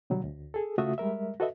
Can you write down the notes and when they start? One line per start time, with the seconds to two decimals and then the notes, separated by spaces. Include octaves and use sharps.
0.10 B2 D3 F#3 G3
0.24 D2
0.54 G#4 A4
0.78 C#3 A3 F4 F#4 E5 D#6
0.98 G3 G#3 A#4 E5
1.40 F#4 A4 B4 D#5 E5